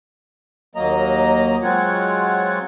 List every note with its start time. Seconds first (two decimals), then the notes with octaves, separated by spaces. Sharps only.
0.75 D#2 F#3 A#3 D#5 A#5
1.62 F#3 G#3 C4 F4 C#5 F#5